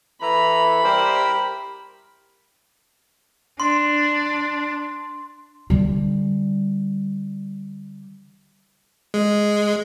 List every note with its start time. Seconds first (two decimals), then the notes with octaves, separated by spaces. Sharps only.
0.22 E3 A4 A#5 B5
0.83 G3 E4 G4 A#4 C5
3.60 D4 C6
5.70 D3 G3
9.14 G#3